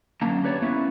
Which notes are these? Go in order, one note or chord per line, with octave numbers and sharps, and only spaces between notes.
F#2 D3 A#3 C#4 A5 A#5
G4 B4 C#5 D5
A#3 B3 C#4 E4 B4